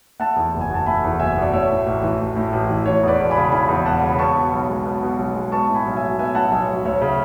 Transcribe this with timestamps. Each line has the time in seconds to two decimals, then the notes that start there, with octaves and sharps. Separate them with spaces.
0.20 A3 F#5 A5
0.36 E2
0.54 F#1
0.61 G#5
0.69 B2 A5
0.86 A3 G#5 B5
1.04 E2
1.20 F#1 E5 G#5
1.37 B2
1.42 D5
1.53 A3 C#5 E5
1.70 A2
1.86 A1
2.03 E3
2.20 A3
2.37 A2
2.53 A1
2.69 E3
2.86 E3 C#5
3.03 E2 B4 D5
3.19 E1
3.30 G#5 B5
3.37 C#3
3.52 E3 G#5 B5
3.69 E2
3.85 E1 F#5 A5
4.03 C#3 B5
4.19 B3 A5 C#6
4.35 B2
4.52 B1
4.69 G#3
4.86 B3
5.03 B2
5.19 B1
5.35 G#3
5.52 B3 A5 C#6
5.69 A2
5.75 G#5 B5
5.86 B1
5.96 E5 G#5
6.03 F#3
6.19 B3 E5 G#5
6.35 A2 F#5 A5
6.51 B1 E5 G#5
6.68 F#3
6.85 D2 C#5 E5
7.01 C#3